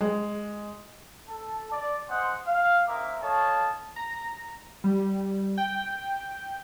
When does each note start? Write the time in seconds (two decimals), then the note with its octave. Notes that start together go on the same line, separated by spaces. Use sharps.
0.01 G#3
1.29 A4 A5
1.72 D5
2.09 C5 D#5 F#5 G#5 C6
2.47 F5
2.87 A#3 C4 D#4 A#4 E5 D6
3.22 A4 C#5 D#5 F5 A5
3.96 A#5
4.84 G3
5.58 G5